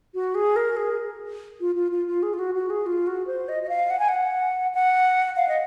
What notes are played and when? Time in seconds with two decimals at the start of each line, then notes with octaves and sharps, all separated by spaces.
0.14 F#4
0.35 G#4
0.56 A#4
0.77 G#4
1.60 F4
1.76 F4
1.92 F4
2.08 F4
2.23 G#4
2.34 F4
2.39 F#4
2.55 F#4
2.70 G#4
2.86 F4
3.07 F#4
3.27 C5
3.49 D#5
3.63 D#5
3.69 F5
3.90 F#5
3.99 G#5
4.08 F#5
4.74 F#5
5.37 F5
5.48 D#5